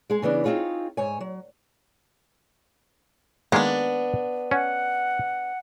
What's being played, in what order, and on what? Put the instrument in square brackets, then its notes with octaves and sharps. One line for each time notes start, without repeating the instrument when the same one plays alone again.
[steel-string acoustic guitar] G#3 G#4
C#3 E3 B3 D4
C4 D#4 F4 G#4 C#5
G#2 C#5 G#5
F#3
[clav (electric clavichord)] D#3 G#3 A#3 [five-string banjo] B3 D4
[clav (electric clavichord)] C#4 [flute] F#5